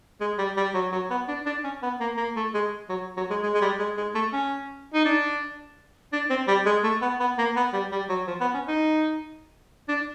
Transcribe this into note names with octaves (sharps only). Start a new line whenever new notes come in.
G#3
G3
G3
F#3
F#3
B3
D4
D4
C#4
B3
A#3
A#3
A3
G#3
F#3
F#3
G#3
G#3
G#3
G3
G#3
G#3
A3
C#4
D#4
D4
D4
C4
G3
G#3
A3
B3
B3
A#3
B3
G3
G3
F#3
F3
B3
C#4
D#4
D4